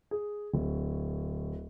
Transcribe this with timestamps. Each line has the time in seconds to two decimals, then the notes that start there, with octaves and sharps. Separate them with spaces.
0.11 G#4
0.53 D1